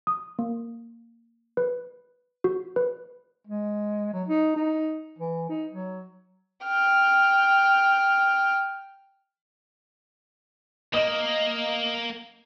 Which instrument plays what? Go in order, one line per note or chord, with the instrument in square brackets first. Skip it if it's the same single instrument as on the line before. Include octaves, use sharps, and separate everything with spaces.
[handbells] D#6
A#3
B4
F#4
B4
[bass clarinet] G#3
F#3
D#4
D#4
E3
D#4
F#3
[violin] G5 F6
[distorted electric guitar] A#3 [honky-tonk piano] D#5 F#7